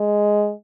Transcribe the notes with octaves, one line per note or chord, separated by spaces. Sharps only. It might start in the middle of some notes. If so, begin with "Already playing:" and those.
Already playing: G#3